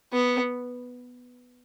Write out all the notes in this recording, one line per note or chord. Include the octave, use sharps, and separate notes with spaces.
B3